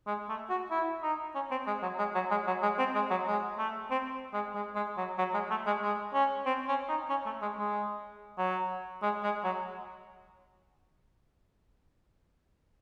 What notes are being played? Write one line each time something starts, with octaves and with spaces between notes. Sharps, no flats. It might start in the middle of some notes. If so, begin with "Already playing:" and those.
G#3
A3
F#4
E4
D#4
C#4
C4
G#3
F#3
G#3
F#3
G#3
F#3
G#3
C4
G#3
F#3
G#3
A3
C4
G#3
G#3
G#3
F#3
F#3
G#3
A3
G#3
G#3
C#4
C4
C#4
D#4
C#4
A3
G#3
G#3
F#3
G#3
G#3
F#3